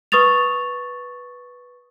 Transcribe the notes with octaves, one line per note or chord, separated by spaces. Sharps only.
B4 C#6 D#6 A6 F7